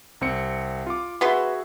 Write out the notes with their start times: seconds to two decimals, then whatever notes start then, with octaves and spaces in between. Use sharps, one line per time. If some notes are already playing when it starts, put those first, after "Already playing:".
0.21 C2 C4 C#7
0.86 F4 D6
1.21 B3 F#4 G#4 B4 E5 C6